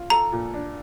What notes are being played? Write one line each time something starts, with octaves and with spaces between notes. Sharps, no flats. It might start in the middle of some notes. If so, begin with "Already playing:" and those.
Already playing: F4
A4 A#5
A#2
D4